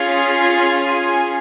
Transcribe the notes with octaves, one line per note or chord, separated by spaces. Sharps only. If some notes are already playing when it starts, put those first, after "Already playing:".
Already playing: C#4 F4 G#4
G#5
G#5